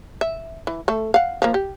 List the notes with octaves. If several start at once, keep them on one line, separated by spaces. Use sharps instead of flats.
E5
E3
A3 A4
F5 F#5
F3 A#3
G4